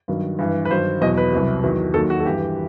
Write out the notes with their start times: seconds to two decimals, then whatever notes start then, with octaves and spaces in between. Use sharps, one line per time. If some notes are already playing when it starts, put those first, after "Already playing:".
0.08 G2 D#3 F#3
0.39 G2 E3
0.65 B4
0.70 G2 D#3 F#3 C5
1.01 E2 B2 F#3 D#5
1.17 B4
1.33 C2 C3 F#3
1.63 E2 D#3 F#3
1.94 D#2 D#3 F#3 A4
2.10 F#4
2.20 A4
2.25 G2 E3 G4